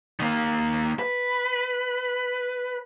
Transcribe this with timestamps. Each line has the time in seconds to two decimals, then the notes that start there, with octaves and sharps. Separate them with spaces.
0.20 D#3 A#3
0.99 B4